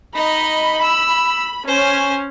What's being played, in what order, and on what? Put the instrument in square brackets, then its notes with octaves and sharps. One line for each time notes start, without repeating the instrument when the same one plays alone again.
[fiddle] D#4 D#5 [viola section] B5
[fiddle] E6
[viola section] C#4 [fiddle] C5 G#5